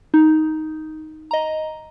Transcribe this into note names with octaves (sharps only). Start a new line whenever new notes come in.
D#4
D#5 A#5